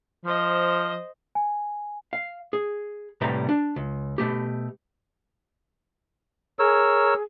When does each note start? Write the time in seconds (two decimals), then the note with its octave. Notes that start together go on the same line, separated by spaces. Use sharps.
0.25 F3 C5 D#5
1.35 G#5
2.13 F5
2.53 G#4
3.21 A2 C3 G3 B4 A#5
3.49 D4
3.76 C#2
4.18 B2 A3 G4
6.59 G#4 A#4 C#5 E6